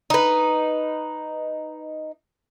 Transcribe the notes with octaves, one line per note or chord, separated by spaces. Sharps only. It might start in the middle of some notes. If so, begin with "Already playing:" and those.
D#4 B4